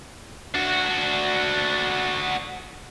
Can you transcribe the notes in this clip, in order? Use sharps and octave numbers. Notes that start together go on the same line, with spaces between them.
D4 F#4